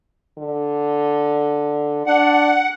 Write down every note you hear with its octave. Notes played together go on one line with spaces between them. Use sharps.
D3
D4 F#5